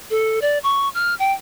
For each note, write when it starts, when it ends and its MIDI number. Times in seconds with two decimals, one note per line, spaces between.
0.10 0.40 69
0.42 0.58 74
0.63 0.89 85
0.95 1.15 89
1.19 1.32 79